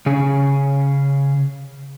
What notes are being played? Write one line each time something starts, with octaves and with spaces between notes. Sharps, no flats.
C#3 C#4 G#4